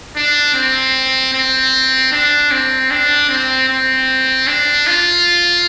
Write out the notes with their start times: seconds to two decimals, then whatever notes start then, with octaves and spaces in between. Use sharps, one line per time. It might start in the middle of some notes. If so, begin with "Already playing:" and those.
0.17 D4
0.55 C4
1.33 C4
2.12 D4
2.51 C4
2.90 D4
3.29 C4
3.69 C4
4.47 D4
4.87 F4